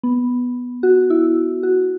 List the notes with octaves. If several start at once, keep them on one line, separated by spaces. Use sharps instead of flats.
B3
F#4
E4
F#4